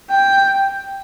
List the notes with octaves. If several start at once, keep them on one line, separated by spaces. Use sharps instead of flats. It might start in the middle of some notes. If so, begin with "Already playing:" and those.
G5